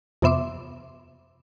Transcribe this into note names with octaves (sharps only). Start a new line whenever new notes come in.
F2 C3 B3 E5 C6 D6